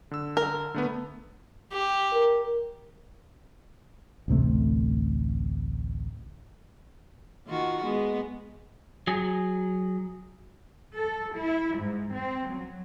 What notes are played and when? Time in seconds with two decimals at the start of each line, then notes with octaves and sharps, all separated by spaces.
0.11 D3 E6
0.37 A#4
0.74 D3 A3 B3
1.72 G4
2.13 A#4
4.28 A1 D2 C3 A3
7.47 D#3 F4 F#4
7.83 G#3 B3
9.07 F#3 G#4
10.95 A4
11.34 E4
11.78 G#2
12.14 C4
12.49 F#3